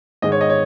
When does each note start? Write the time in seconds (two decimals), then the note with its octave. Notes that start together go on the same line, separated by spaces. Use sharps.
0.22 G#2 D#3 G#3 D#5
0.32 C#5
0.41 D#5
0.50 C#5